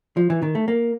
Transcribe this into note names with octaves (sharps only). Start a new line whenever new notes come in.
F3
E3
D#3
A3
A#3